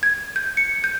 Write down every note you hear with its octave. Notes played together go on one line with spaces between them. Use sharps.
G#6
G6
C#7
G6